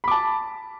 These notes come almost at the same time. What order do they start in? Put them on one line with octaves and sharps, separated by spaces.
B5 D6 A5